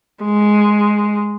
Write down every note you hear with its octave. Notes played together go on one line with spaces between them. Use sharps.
G#3